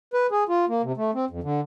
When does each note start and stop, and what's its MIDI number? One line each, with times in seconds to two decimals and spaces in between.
0.14 0.27 71
0.31 0.44 68
0.49 0.65 65
0.69 0.82 58
0.83 0.92 48
0.97 1.11 57
1.14 1.25 60
1.30 1.40 41
1.43 1.61 50